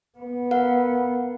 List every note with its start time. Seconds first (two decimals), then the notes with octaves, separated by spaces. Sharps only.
0.18 B3
0.51 A#4 F5 F#5